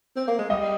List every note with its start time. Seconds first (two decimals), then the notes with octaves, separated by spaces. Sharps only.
0.17 C4
0.28 A#3
0.39 G#3
0.50 G3 D#5